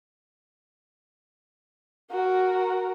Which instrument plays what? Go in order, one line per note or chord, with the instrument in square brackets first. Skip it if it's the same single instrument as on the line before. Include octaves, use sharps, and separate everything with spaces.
[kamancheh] F#4 A#4